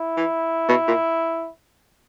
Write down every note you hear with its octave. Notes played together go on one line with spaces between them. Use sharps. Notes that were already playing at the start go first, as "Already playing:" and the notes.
Already playing: E4
E3
B2
A#2